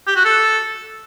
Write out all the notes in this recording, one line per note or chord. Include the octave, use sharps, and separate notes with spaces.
G4
F#4
A4